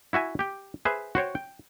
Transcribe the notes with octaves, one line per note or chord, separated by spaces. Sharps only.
E4 F#4 E5 G#5
G4 G5
G#4 B4 C5 E5
F#4 C5 C#5 G5
G5